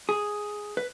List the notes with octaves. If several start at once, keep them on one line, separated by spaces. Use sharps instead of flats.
G#4
B4